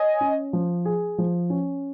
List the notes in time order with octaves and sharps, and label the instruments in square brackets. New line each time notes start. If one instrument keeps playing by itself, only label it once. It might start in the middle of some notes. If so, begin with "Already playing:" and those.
Already playing: [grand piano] C#5 [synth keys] D#5 G#5
[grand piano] C#4
F3
G#4
F3
C#4